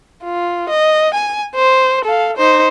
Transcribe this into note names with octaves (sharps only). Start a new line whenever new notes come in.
F4
D#5
G#5
C5
A4 F5
D#4 C5